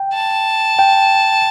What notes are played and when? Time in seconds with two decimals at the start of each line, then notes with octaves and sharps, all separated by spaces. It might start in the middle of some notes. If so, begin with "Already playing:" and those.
Already playing: G5
0.14 A5
0.79 G5